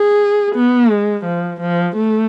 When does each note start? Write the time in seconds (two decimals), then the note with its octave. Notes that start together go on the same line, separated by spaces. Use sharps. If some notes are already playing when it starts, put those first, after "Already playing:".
Already playing: G#4
0.55 B3
0.90 G#3
1.25 F3
1.61 F3
1.96 A3